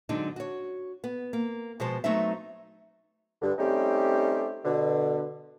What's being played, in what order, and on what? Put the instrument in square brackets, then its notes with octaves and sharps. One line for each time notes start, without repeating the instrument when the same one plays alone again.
[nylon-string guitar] D3 F#3 G#3 C4 D4 D#4
F#4 C#5
B3
A#3
B2 F3 G#3 C5 A5
F#3 A3 B3 C4 D#4 E5
[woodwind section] G2 D3
G3 A3 C4 C#4 D#4 G4
B2 D3